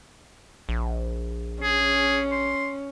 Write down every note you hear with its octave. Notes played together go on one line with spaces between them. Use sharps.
A#1
C#4 G#4
C6